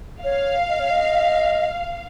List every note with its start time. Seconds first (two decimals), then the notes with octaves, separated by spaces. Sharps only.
0.24 C#5 F5
0.69 D#5
0.80 C#5
0.90 D#5